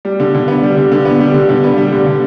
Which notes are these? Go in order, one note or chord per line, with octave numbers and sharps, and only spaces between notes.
G3
D3
D3
B3
G3
D3
D3
B3
G3
D3
D3
B3
G3
D3
D3